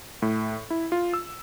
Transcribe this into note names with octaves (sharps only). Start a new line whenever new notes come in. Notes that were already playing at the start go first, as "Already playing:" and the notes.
A2
E4
F4
E6